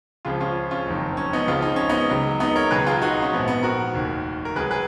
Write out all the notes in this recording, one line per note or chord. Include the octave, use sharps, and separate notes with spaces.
C#2 C#3 F3 F4 G#4
C#4 F4
C#4 F4
F#1 F2 D#3 F#3
C#4
B3 D#4
C#2 C#3 F3 F4
D#4
C#4
B3 D#4
C#2 C#3 F#3
B3 D#4
A#4 C#5
C#2 B2 F#3 G#4 B4
F4 G#4
D#4 F#4
C#4
A#1 G#2 F3 B3
B3
F#4 A#4
F1 D#2 D#3
A#4
C#2 C#3 F#3 G#4 B4
G#4 B4